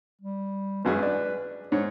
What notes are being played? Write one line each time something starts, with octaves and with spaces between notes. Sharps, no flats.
G3
G#1 F#2 G#4 B4
D4
G#2 C#5